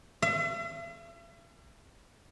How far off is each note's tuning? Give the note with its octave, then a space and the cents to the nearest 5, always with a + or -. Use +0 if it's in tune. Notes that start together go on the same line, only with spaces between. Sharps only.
E5 +45